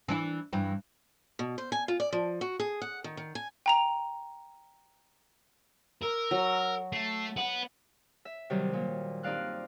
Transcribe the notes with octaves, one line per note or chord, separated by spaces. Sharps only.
E3 D4 E4
G2 E3
B2
C5
G#5
F4
D5
F3
F#4
G#4
F#5
D#3
D#3
G#5
G5 A#5 F7
A#4 E6
F#3
A3 C7
B3 F#5 F#7
E5
C3 D#3 F#3 G3
A#2 G3
G2 C4 D#4 D5 F5 F#6